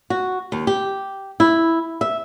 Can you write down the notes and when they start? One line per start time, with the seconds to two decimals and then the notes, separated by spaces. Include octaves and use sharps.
0.10 F#4
0.52 D#2
0.67 G4
1.40 E4
2.01 E5